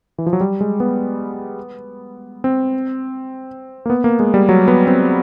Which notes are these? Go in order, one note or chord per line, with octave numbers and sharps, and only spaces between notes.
E3
F3
F#3
G3
G#3
B3
C4
A#3
B3
A#3
G#3
G3
F#3
B3
C4